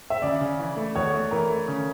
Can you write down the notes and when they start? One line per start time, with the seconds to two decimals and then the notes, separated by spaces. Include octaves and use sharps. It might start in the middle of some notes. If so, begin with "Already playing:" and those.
0.10 E5
0.22 C#3 D5
0.41 C#3
0.59 E3
0.77 A3
0.95 E2 C#5
1.14 A3
1.31 E3 A#4
1.50 A3
1.68 C#3